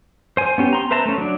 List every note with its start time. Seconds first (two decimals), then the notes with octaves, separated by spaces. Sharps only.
0.37 C5 G#5
0.58 B3 C#4 G4
0.73 A#5 C6
0.91 B4 C5 E5 A5 A#5
1.06 A3 C#4
1.18 F#3 D4